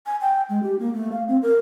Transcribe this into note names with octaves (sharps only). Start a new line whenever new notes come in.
G#5
G5
G#3
G4
A#3
A3
F5
C4
A#4